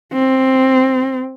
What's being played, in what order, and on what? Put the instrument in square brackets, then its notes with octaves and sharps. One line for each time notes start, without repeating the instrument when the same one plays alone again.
[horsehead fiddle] C4